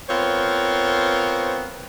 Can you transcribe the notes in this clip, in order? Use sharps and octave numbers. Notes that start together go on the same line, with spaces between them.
B3 C4 F4 A#4 C5 C#5